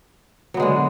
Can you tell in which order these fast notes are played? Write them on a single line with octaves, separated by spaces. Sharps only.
F#3 B3 G#3 D3